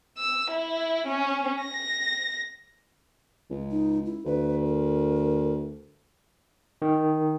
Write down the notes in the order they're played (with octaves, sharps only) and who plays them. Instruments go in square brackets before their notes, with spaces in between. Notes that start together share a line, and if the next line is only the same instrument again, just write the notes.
[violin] E6
E4
C#4
A#6
[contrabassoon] C#2
[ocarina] D#4
E4
[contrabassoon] D2 [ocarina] B4
[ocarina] A#4
[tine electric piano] D#3